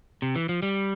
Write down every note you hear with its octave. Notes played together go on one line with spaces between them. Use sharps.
C3
E3
F3
G3